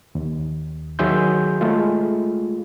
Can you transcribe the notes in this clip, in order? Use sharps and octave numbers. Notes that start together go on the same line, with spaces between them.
D#2
D#3 F#3 G#4 E5 C6 G6
G#3 A3 F4